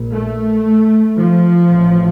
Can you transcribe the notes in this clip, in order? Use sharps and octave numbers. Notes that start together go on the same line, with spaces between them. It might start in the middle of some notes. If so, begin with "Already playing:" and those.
Already playing: A#1 A#2
A3
F3
A1 A2